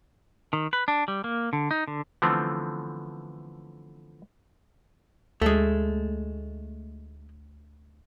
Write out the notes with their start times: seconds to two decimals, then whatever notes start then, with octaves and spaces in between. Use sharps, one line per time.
0.53 D#3
0.73 B4
0.88 D4
1.08 G3
1.24 A#3
1.53 D3
1.71 D#4
1.88 D3
2.22 D3 E3 F3 A3 B3 C4
5.42 D2 G#3 A3